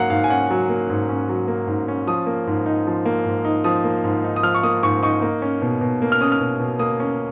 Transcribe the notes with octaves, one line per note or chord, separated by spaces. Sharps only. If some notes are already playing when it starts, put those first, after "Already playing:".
Already playing: G#2 F#3 A#3 C#4 F5 F#5 A#5
G#2 F5
G#5
C#4 F#5
F#3
A#3
G#2
C#4
F#3
A#3
G#2
C#4
F3 D#6
A#3
G#2
D#4
F3
A#3
G#2
D#4
F3 D#6
A#3
G#2
D#4
D#6
F3 F6
C#6
A#3 D#6
G#2 C#6
D#4 C#6
A#3
C#4
B2
B2
A#3
F6
C#4 D#6
F6
B2
B2
A#3 D#6
C#4